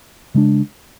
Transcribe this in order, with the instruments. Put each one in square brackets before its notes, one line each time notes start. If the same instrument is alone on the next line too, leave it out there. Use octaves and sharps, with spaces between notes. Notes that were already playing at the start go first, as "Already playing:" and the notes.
[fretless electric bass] C#3 G#3 D4